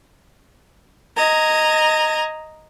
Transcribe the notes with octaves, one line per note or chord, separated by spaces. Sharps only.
D#5 A#5 G#6